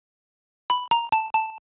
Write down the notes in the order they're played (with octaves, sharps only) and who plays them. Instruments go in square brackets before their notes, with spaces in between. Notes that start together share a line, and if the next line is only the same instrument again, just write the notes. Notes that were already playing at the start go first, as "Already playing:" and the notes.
[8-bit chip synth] B5
A#5
A5
A5